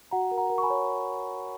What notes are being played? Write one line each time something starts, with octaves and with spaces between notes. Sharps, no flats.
F#4 F#5 A#5
A#4
F#5 A#5
A#4
C#6
G#5 B5
C#5